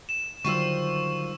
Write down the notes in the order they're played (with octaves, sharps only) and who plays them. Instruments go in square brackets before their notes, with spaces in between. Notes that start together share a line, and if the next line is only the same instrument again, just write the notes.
[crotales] E7
[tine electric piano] D3 F#3 G3 [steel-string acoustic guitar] D#3 F4 C5 [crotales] C#6 E6